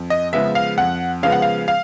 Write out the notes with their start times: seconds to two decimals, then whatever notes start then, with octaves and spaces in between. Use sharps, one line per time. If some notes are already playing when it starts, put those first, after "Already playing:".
Already playing: F2
0.10 D#5
0.33 C#3 F3 G#3 B3 E5
0.55 F5
0.78 F2 F#5
1.23 C#3 F3 G#3 B3 F5
1.32 F#5
1.42 F5
1.68 F5